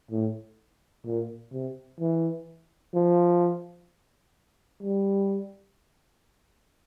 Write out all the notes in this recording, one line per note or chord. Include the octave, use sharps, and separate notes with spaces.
A2
A#2
C3
E3
F3
G3